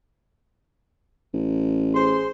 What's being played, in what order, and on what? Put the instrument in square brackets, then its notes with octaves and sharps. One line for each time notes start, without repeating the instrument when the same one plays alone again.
[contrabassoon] A1
[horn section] G#4 C5 C6